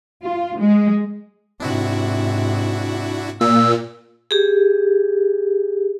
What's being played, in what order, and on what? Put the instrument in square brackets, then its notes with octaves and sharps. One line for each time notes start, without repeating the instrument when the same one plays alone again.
[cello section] F4
G#3
[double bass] G#2 C3 [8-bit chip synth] D4 E4 F#4
[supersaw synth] A#2 [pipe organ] E6
[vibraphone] G4 G#4